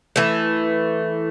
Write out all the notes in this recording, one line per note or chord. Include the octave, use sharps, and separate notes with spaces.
E3 A3